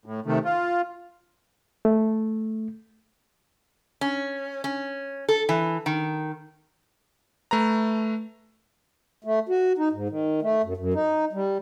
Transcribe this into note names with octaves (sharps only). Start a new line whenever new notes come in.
A2
C3 D#3 A3
F4
A3
C#4
C#4
A4
E3
D#3
A3 B4 A#5
A3
F#4
D#4
G#2
D#3
A3
F#2
F#2
D#4
G3